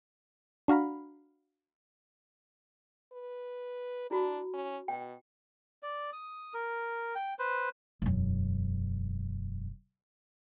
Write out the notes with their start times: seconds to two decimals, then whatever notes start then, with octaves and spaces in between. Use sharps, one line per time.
0.68 D4 F#4 F5 A#5 B5
3.13 B4
4.11 D4 E4 F#4
4.53 C#4
4.88 B2 G5
5.83 D5
6.13 D#6
6.54 A#4
7.15 G5
7.39 B4 C5
8.02 E1 F#2